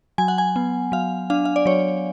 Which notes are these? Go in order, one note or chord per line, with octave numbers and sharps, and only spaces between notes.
F#3 G#5
F#5
G#5
B3
F#3 F5
D4 F5
F5
D5
F#3 C#5